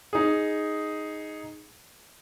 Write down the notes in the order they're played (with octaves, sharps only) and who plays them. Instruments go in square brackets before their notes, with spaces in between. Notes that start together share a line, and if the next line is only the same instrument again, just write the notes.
[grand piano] D#4 G#4